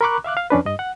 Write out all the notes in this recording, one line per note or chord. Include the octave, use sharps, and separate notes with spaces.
A#4 A#5 B5 C#6 D6 F#6
E5 F5 D6 F#6
F5
F2 C#4 D4 B4
G2 D#5
F#5